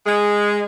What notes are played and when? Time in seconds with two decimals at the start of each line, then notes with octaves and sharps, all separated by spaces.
0.06 G#3